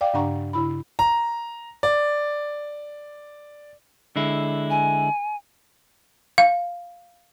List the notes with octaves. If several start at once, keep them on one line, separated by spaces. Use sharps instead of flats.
D5 F5 G5 D6
G2 C#3 D4 F#5 A#5 C#6
C#3 E4 B5
A#5
D5
D3 G#3 E4
G#5
F5